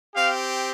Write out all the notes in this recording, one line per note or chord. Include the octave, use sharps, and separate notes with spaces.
C4 G4 F5